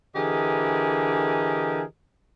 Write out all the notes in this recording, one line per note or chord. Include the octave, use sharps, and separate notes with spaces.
D3 E3 G4 G#4 A#4 D#5